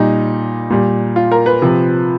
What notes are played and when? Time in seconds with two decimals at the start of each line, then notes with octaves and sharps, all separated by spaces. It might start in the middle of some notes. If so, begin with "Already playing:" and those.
Already playing: A#2 G3 D#4
0.70 A#2 G3
1.16 F4
1.32 A#4
1.46 B4
1.62 C3 F3